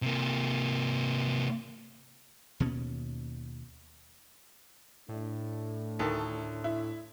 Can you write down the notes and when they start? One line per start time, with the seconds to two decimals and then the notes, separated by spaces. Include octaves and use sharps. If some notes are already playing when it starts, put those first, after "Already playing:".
0.02 C3 A#3
2.60 D#2 B2 C#4
5.09 A2 A3 D4
5.99 D2 D#3 A4
6.64 E4